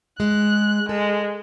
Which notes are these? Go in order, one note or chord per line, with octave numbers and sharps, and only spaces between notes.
G#3 F#6
G#3 A4